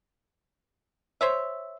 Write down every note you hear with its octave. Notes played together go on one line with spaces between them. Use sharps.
C5 C#5 E5